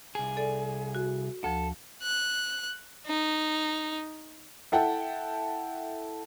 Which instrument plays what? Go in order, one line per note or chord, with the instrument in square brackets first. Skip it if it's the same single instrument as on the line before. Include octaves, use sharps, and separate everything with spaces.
[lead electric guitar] C2 G#4
[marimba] A4 D5
F#4
[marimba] D2 F3 [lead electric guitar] A4
[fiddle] F#6
D#4
[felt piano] E4 A4 F#5 G5